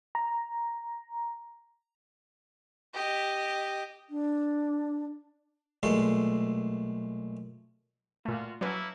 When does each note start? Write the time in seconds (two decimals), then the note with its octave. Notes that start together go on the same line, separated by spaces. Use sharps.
0.15 A#5
2.94 G4 D#5
4.10 D4
5.83 B1 A#2 G#3 A3 A4 C6
8.25 A#2 A3 F4 F#4
8.61 F#3 A3 A#3 C#4 E4 B4